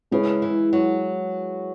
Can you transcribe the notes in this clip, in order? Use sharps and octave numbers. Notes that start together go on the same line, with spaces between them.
C#3 G#3 E4 G#4 B4
E3
F#3